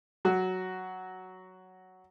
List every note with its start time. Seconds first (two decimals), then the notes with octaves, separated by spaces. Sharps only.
0.25 F#3 F#4